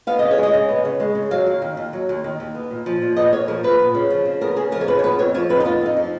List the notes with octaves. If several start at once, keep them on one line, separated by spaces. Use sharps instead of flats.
B3 F5
C#3 D#5
C#5
G#3 D#5
C#3
B3
C#3
G#3
C#3
F#3 F5
D#2
D#3
D#2
F#3
D#2
D#3
D#2
B3
A#2
F3
A#2
B3 D#5
A#2 C#5
F3 A#4
A#2 B4
B3
C#3
F3
C#3
B3 A#4
C#3 G#4
F3 A#4
C#5
C#3 B4
C#5
B3 B4
F2 C#5
F3 C#5
F2 B4
D#4
B3 F4
F2 D#4
F3